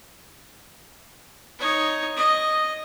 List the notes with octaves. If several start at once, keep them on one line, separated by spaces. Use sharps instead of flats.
D#4 C#5
D#5